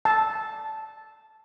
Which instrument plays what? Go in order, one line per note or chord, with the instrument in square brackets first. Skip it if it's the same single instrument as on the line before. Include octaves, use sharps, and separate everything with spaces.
[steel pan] A5